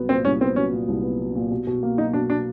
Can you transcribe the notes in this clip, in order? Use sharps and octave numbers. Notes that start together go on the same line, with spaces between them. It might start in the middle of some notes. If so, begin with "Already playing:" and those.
Already playing: C2 F#3 B3
A#2 C4
C2 C#4
B3 C4
F#3 C#4
A#2
C2
B3
F#3
A#2
B2
B2
A#3
F#3 D#4
B2 D4
B2 D4